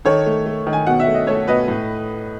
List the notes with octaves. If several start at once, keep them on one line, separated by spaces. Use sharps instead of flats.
D#3 A4 C#5
A3
A3
D#3
G#5
B2 F#5
E5
A3
D#5
A3 A4 C#5
B2 B4 D#5
A2